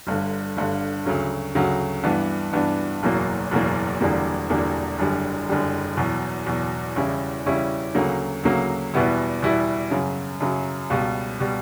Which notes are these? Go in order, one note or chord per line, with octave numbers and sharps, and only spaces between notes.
G1 G2 D3
G1 G2 D3
D2 C#3 F#3
D2 C#3 F#3
G2 E3 B3 D4
G2 E3 B3 D4
F#1 E2 B2 F#3 A#3
F#1 E2 B2 F#3 A#3
E1 E2 D3 G3 A#3
E1 E2 D3 G3 A#3
F#1 F#2 D3 G3
F#1 F#2 D3 G3
E2 B2 F#3
E2 B2 F#3
E2 C#3 G3 C#4 E4
E2 C#3 G3 C#4 E4
D2 C#3 F#3 A#3
D2 C#3 F#3 A#3
E2 B2 G3 B3 E4
E2 B2 G3 B3 E4
F#2 C#3 F#3
F#2 C#3 F#3
C#2 B2 G3
B2 G3